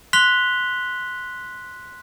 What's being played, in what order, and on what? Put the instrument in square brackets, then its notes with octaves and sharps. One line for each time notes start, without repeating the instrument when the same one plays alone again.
[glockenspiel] C6 F#6 B6 F7 G7